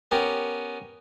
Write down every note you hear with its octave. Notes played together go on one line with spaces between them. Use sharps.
B3 C#4 G4 A#4